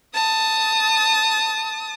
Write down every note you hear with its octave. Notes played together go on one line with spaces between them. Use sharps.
A5 D#6